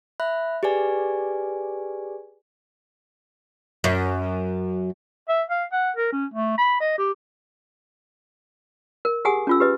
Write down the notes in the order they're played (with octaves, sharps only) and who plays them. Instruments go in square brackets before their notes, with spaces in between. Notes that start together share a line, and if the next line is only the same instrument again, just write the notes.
[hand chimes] E5 B5 F#6
G4 G#4 B4 D5 G#5
[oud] F#2
[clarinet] E5
F5
F#5
A#4
C#4
A3
B5
D#5
G4
[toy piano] A#4
G4 G#4 F#5 G#5 D#6
C#4 F4 E6
G4 B4 D#5